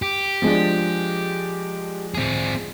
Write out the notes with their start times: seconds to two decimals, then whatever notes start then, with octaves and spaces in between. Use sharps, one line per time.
0.02 G4
0.42 F3 G#3 D4
2.15 C4 G#4